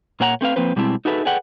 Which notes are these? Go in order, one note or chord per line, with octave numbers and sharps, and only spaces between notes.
A#2 A#3 C#5 F#5 G#5 A#5
A3 C4 B4 F5
F3 A#3 C4 B4 C5
B2 G3 G#3 C4 E4 A5
D#4 F#4 G#4 A4 B4 E5
G#4 A4 B4 D5 F#5 G5